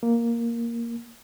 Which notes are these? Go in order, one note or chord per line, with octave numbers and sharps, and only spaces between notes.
A#3